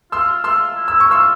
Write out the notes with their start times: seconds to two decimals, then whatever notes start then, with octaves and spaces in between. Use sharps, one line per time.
0.12 F4 C6 E6
0.44 F4 C6 E6
0.76 E4
0.88 E6
1.00 C#6
1.08 F4 C6 E6